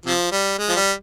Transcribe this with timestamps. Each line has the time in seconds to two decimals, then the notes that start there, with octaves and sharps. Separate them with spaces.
0.06 C3 F3
0.32 G3
0.58 G#3
0.69 F3
0.76 G3